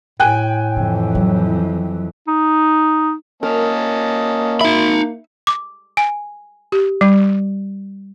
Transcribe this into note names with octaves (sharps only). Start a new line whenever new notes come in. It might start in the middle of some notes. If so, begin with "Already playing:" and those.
A2 G5 G#5 F#6
F2 D3 E3
F#3
D#4
A#3 C#4 A#4 D#5 A5
D#4 E5 B5
D6
G#5
G4
G3